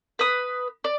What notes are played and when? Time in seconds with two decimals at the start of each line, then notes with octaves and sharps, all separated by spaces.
0.19 B4 D#6
0.84 D5